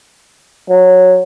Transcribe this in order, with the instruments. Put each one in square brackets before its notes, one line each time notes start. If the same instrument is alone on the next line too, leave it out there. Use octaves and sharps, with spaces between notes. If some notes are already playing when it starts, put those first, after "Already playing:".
[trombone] F#3